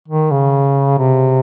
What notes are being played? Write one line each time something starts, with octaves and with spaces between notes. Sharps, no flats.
D#3
C#3
C3